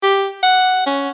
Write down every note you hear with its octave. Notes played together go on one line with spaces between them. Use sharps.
G4
F#5
C#4